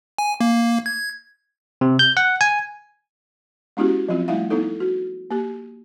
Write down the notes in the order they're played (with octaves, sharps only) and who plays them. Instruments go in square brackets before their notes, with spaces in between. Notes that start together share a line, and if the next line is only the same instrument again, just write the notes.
[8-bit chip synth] G#5
A#3
G#6
[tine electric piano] C3
G6
F#5
G#5
[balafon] G#3 B3 C#4 E4 F#4 G4
F3 F#3 C4 F4
G3 A3 E4 E5 F5
B3 D#4 E4 A4
F#4
A#3 G4